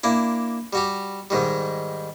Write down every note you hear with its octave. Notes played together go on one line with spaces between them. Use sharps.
A#3 D4 E4
G3 F#4 G4
G#2 D#3 G3